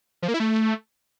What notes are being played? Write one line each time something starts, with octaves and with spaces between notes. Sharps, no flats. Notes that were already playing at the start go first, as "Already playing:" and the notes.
F3
A#3
E4
A3